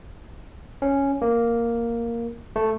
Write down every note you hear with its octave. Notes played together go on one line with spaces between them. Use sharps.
C#4
A#3
A3